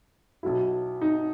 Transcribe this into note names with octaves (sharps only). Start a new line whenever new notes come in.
B1 B2 F#3 E4
D#4